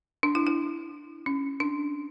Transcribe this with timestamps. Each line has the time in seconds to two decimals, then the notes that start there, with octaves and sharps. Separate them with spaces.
0.23 D4
0.35 E4
0.47 E4
1.26 C#4
1.60 D4